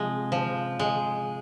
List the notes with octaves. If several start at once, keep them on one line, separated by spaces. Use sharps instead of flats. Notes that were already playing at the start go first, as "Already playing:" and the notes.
Already playing: C3 F3 G#3
F3
G#3